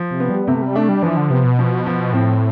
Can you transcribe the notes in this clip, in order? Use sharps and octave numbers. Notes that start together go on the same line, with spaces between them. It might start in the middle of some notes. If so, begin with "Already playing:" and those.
Already playing: F3
C3
B3
G3
C3 A3
G3
A3 D4
G3
E3 F3
D3
C3 B3
B2
F3
F3
A2 C4